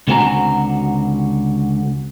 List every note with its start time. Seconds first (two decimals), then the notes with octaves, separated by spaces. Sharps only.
0.08 C#2 D3 C4 F#4 G#5 A#5